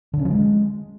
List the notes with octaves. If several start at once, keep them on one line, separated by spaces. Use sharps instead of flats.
D3
C#4
F3
G#3